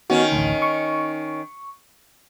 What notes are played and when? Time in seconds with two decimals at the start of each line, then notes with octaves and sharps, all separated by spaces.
0.10 D#3 B3 C#4 F#4
0.32 A1 D2
0.62 C#6